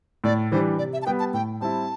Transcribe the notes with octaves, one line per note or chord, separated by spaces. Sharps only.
A2 D5
E3 G3 D4 C5
C3 D5
E5
A5
G3 B3 G5
A5
A2 G5
G3 C4 E4 A5